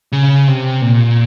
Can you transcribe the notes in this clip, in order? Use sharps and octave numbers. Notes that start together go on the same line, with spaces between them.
C#3
C3
A#2